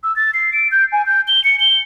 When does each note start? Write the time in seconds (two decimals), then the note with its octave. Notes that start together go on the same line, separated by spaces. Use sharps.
0.03 E6
0.16 A6
0.34 C7
0.53 D7
0.71 G6
0.92 G#5
1.06 G6
1.28 G7
1.44 C#7
1.60 G7